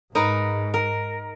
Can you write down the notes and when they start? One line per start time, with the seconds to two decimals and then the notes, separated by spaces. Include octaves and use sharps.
0.15 G#2 D#4 A#4 B4
0.74 A#4